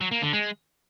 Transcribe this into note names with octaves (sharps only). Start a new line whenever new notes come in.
F#3
A#3
D3
G#3